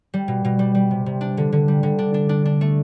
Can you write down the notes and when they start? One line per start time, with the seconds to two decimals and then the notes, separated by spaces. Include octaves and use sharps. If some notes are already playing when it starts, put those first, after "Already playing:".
0.14 G3
0.28 B2
0.45 B2
0.59 G3
0.75 G3
0.91 C3
1.06 C3
1.21 D4
1.37 D3
1.52 D3
1.68 G3
1.83 D3
1.99 D4
2.14 D4
2.29 D4
2.45 D4
2.61 A3